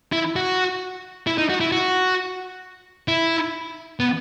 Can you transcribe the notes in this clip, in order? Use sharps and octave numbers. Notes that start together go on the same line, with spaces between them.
E4
F#4
E4
D#4
F#4
E4
F#4
E4
B3